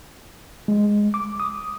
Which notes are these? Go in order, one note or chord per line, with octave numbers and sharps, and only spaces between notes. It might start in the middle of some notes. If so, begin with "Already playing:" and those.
G#3
D6
D#6